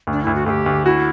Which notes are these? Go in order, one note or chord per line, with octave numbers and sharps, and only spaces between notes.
D2
D4
D2 E4
F#4
D2 G4 A4
D2
E4 F#4